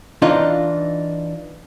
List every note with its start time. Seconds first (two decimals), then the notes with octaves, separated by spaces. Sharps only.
0.22 E3 D4 D#4 F4